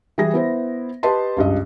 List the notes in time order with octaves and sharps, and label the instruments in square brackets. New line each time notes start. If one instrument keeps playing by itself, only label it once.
[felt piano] E3 G3 G#4 G#5 A#6
B3 E4 C5
G4 B4 D#5 A5 C6
C#2 G2 D#5